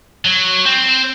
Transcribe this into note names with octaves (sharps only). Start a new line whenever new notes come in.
F#3
C4